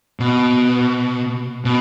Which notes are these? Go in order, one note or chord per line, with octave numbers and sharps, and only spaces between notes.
B2
B2